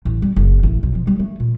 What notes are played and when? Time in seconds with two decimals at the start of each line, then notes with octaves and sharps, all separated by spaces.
0.05 A1
0.22 G3
0.36 F#1
0.63 A1
0.83 B1
0.95 F3
1.07 G3
1.19 A3
1.40 A#2